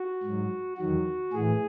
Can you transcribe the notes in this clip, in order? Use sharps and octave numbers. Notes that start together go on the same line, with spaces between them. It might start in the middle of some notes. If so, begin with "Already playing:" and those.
Already playing: F#4
G#2 F#3
E2 D#3 F#3 F#4
A2 E3 G#4